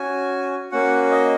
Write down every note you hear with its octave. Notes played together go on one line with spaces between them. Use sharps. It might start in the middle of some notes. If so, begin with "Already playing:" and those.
Already playing: C#4 F#4 G#5
A#3 C#4 F#4 F#5
D#5